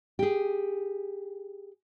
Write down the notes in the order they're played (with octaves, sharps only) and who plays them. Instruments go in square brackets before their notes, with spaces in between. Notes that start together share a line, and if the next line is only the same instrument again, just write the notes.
[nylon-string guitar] G4 G#4